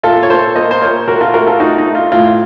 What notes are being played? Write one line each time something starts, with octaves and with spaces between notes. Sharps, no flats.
A#2 F4 A4
C#5
A#2 A4 C5
A#3 C5 D#5
C5
A#2 A#4 C#5
A#2 F#4 A#4
F4 A4
A3 F#4 A#4
F4 A4
A3 D#4 F#4
D#4
A3
F4
A2 F4